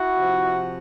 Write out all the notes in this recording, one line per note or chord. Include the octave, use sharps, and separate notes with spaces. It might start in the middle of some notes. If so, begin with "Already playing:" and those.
Already playing: E4 F#4
C3 F3